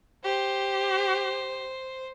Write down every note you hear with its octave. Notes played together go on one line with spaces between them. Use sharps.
G4 C5